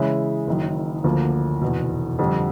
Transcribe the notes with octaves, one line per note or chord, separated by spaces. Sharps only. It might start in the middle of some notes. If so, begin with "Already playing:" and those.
Already playing: C#3 E3 G#3 C#4 E4
F#1 F#2 D#3
D2 D3 F3 A#3
F1 E2 B2
F2 D3 G3